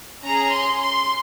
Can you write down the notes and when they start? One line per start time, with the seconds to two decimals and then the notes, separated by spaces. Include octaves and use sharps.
0.24 C#4 G#4 A#5
0.53 C6
0.82 C6